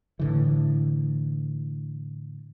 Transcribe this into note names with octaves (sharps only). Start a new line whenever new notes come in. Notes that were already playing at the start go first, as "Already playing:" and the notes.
A2 D3 E3